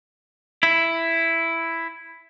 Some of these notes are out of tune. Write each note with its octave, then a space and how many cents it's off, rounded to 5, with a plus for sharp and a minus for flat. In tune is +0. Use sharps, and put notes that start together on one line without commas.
E4 +5